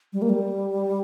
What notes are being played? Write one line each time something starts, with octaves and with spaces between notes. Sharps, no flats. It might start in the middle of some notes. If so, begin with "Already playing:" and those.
G3
A#3
G3